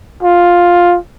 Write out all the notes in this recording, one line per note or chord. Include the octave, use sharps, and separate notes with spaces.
F4